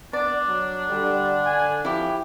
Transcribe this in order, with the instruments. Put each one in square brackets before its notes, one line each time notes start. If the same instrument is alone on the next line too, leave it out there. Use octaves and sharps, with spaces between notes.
[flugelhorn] B3 [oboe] D4 [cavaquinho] D5
[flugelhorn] F#3
[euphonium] D3 [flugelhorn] G3
[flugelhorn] G#5
[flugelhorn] F3 [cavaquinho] E4 G4